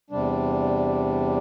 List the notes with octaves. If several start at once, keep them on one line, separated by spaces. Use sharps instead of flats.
E2 C3 G3 D4